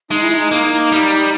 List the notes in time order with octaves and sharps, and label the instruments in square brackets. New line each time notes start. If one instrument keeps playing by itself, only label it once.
[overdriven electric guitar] G#3 [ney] D#4
[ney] E4
D#4
[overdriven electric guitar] A#3
G3